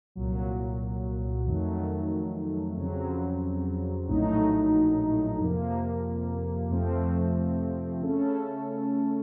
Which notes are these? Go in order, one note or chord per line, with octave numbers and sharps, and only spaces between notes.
C2 A#2 F#3
F2 D#3 F#3 A3
F2 C#3 F#3 C4
A#1 A2 F#3 A3 D#4
F2 C3 F3 A#3
F2 C3 F3 A3 C4
C#3 A3 C#4 A4